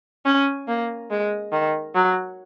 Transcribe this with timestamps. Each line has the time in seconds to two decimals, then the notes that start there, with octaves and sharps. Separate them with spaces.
0.25 C#4
0.68 A#3
1.11 G#3
1.52 D#3
1.95 F#3